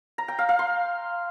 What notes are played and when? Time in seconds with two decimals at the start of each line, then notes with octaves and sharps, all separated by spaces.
0.18 A#5
0.28 G5
0.39 F5
0.49 F5
0.59 C6